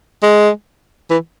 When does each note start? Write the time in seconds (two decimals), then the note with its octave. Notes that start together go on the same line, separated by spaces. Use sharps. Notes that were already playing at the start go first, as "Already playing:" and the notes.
0.23 G#3
1.10 E3